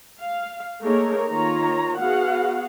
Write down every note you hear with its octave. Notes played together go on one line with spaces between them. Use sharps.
F5
A3 A#3 D#4 G#4 A#4 C#5
D#3 A#3 F4 C#5 A#5
B3 F#4 G#4 F5 F#5